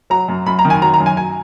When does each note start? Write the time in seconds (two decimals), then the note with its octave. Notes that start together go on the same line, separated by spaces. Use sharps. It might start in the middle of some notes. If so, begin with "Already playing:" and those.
0.10 F#3 A#5
0.28 F#2
0.46 F#2 B5
0.59 A#5
0.65 D#3
0.70 G#5
0.82 F#3 A#5
0.94 A#5
1.00 F#2
1.06 G#5
1.17 G#5